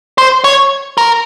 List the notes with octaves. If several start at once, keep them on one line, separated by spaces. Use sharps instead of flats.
C5
C#5
A#4